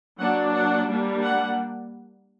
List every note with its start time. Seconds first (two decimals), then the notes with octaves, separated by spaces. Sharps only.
0.19 F#3 A#3 D4 F#5
0.54 F#5
0.88 G3 A#3 D4
1.23 F#5